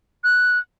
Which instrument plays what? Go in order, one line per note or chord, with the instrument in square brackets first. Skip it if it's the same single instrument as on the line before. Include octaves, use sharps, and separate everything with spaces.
[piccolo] F#6